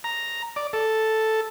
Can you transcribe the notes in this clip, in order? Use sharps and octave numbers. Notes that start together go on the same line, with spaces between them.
A#5
D5
A4